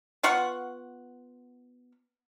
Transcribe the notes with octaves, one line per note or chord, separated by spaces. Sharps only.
B3 F4 F#5 C#6